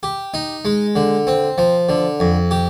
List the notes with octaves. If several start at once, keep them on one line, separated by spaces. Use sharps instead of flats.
G4
D#4
G#3
D3
C4
F3
D3
F2
G4